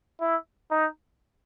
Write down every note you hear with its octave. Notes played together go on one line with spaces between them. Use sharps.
E4
D#4